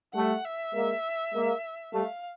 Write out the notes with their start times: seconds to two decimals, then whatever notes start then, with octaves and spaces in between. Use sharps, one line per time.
0.14 G3 A3 F#5
0.45 E5
0.74 G#3 A#3
1.33 G#3 A#3
1.94 G3 A3 F5